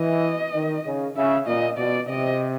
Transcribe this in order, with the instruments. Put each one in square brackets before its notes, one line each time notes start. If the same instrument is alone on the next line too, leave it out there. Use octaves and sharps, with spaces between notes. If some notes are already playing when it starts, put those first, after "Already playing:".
Already playing: [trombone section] E3 [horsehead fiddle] D#5
[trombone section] D#3
C#3
[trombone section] C#3 [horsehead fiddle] E5
[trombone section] A#2 [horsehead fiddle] D#5
[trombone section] B2 [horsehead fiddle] D5
[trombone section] C3 [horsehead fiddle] D#5